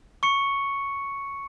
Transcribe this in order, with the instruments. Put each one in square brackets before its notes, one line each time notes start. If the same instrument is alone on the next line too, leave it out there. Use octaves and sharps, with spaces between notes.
[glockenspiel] C#6 C#7